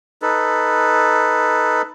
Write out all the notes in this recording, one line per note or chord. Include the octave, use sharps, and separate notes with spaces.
D#4 A4 B4